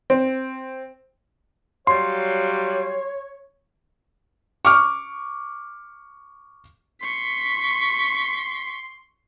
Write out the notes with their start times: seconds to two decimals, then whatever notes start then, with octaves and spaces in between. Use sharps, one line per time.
0.10 C4
1.87 F#3 G3 C#5 F5 C6
4.65 C#6 D6 F6
7.02 C6 C#6 B6